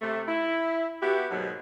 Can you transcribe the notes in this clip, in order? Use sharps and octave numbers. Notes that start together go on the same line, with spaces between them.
C3 A3
E4
B3 E4 F#4 G4
D#2 G#2 B2 F#3